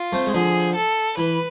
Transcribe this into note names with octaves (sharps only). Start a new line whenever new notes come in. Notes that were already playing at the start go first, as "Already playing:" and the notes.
Already playing: F4
A3 C4
G#3
D3 F3 G#4
A4
E3 B4